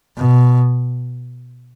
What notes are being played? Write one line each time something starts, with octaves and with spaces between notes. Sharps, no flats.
B2